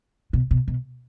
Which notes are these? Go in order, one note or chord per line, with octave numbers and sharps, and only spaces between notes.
B2
B2
B2